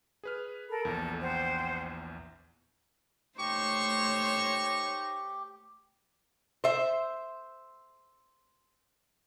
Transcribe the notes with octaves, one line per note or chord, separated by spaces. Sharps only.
G#4 B4 F6
A4 A#4 B5
A#1 E2 A4
C5 F#5 G5
A3 D#4 G4 C5 C#5 C#6
C5 E5